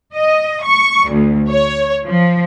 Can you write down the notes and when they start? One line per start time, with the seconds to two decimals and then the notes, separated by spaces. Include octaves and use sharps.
0.14 D#5
0.65 C#6
1.09 D2
1.49 C#5
2.05 F3